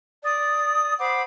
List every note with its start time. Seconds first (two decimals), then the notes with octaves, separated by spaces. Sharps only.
0.23 D5 D#6
0.99 C5 F#5 B5 D6